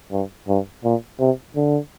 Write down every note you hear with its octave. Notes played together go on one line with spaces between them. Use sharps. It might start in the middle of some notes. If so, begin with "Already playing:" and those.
G2
G2
A#2
C3
D3